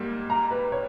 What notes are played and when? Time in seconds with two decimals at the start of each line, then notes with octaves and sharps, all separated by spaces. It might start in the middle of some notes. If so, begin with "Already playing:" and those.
Already playing: G#2 G3 A#3
0.30 A#5
0.51 B4
0.72 C#5